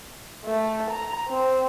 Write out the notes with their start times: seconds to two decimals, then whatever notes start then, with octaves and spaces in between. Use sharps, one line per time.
0.45 A3
0.90 A#5
1.29 C4